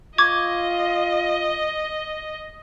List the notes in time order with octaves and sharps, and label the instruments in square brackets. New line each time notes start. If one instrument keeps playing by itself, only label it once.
[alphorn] F4 [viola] D#5 [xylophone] C#6 D6 G#6